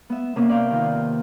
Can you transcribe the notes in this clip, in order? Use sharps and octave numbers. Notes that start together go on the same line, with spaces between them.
B3 E5
C3 A#3 B3 C#4 D6
D5 F5 G6
D#3 F4